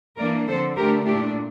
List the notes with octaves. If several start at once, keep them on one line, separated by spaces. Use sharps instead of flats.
E3 A#3 D4 A#4 D5
D3 F3 C4 A4 C5
D3 A3 D4 G4 A#4
A#2 A3 D4 E4 G4